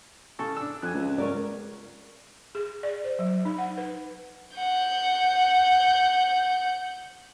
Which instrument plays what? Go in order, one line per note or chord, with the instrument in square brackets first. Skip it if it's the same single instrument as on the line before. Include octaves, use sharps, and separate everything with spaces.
[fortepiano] C#3 A4 C#6
D4 E6
[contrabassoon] F2 [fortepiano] G#5 F#6
[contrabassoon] C#2
[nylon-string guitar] C#4 A#4 D5
[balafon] G#4
D5
C5
F#3
D#4
F#5
B4
[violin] F#5 G6